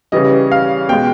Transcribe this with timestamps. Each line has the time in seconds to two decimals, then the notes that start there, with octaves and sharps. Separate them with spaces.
0.12 C#3 E3 G3 D#5
0.52 F5
0.89 B2 G#3 G5